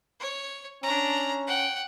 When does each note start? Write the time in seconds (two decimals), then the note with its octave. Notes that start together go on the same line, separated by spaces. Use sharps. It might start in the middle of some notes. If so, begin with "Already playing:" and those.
0.20 C#5
0.83 C#4 D4 A#5
1.47 F#5 G5